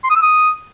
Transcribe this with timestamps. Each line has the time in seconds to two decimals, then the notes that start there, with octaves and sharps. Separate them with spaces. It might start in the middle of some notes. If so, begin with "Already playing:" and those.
0.04 C6
0.10 D#6
0.16 E6
0.22 D#6